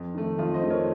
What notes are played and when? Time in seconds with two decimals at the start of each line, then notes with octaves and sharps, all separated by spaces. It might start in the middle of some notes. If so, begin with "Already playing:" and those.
Already playing: F2
0.14 D#3 A3
0.39 F2 F4
0.54 C5 D#5
0.62 D#3 A3
0.70 A#4 C#5